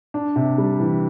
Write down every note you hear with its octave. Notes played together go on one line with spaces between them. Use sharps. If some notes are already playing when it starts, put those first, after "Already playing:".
D4
C3
G3
E3